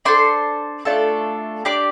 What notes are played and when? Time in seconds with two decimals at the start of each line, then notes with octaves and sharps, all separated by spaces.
0.05 D4 A4 C5 C6
0.85 A3 D4 F4 A4
1.65 D4 G4 D5 D6